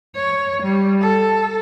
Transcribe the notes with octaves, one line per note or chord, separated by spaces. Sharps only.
C#5
G3
A4